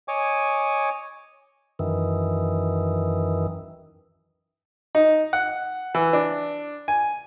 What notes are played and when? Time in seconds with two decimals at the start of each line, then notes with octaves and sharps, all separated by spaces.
0.08 C#5 D#5 G#5 D6
1.79 F#2 D#3 E3
4.95 D#4
5.33 F#5
5.95 E3
6.13 D4
6.88 G#5